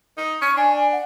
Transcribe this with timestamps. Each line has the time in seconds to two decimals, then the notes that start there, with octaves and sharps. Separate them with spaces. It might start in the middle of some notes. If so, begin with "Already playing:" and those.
0.17 D#4
0.42 C#4 C#6
0.57 D4 G#5
0.74 G#5
0.92 F#5